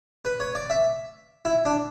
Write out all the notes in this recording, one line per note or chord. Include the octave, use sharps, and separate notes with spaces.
B4
C#5
D5
E5
E4
D4